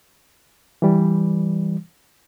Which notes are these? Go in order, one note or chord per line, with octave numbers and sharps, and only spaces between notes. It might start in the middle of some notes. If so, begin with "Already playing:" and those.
E3 G3